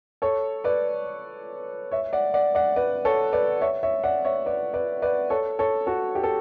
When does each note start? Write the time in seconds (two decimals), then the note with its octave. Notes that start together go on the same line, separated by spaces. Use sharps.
0.22 A4 C#5
0.64 B4 D5
1.91 C#5 E5
2.13 D5 F#5
2.34 D5 F#5
2.55 D5 F#5
2.76 B4 D5
3.05 A4 C#5
3.33 B4 D5
3.61 C#5 E5
3.83 C#5 E5
4.04 D5 F#5
4.25 C#5 E5
4.46 B4 D5
4.74 B4 D5
5.02 B4 D5
5.30 A4 C#5
5.59 A4 C#5
5.87 F#4 A4
6.15 G4
6.23 A4